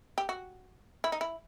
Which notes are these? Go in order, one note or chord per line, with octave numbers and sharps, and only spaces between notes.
G4
F#4
E4
D#4
E4